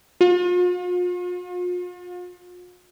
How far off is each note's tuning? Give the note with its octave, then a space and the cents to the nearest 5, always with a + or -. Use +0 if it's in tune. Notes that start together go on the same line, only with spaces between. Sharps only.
F4 +45